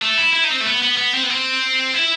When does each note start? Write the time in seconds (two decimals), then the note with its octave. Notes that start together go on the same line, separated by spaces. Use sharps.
0.02 A3
0.18 E4
0.33 E4
0.44 D#4
0.50 C4
0.60 A3
0.66 B3
0.82 B3
0.97 B3
1.14 C4
1.23 B3
1.30 C4
1.94 E4